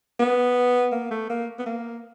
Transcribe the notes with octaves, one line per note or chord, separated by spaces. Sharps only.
B3
A#3
A3
A#3
B3
A#3